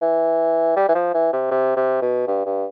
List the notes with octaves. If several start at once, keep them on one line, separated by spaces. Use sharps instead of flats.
E3
G3
E3
F3
E3
C3
C3
C3
B2
G2
G2